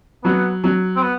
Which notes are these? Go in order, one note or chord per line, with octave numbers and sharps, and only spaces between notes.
F#3 B3
F#3
C4
B3